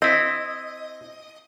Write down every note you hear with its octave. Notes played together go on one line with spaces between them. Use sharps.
C4 E4 D#5